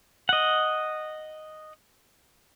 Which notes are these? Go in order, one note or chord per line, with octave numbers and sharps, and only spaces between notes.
D#5 F#5